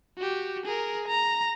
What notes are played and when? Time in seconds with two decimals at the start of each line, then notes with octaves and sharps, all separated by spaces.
0.18 F#4 G4
0.66 G#4 A#4
1.08 A#5